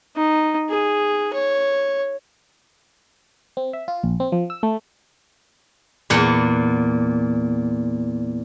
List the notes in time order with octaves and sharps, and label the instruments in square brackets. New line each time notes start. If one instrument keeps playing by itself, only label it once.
[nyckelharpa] D#4
G#4
C#5
[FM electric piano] C4
E5
F4
A#1
C4
F3
E6
A3
[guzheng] E2 A#2 F#5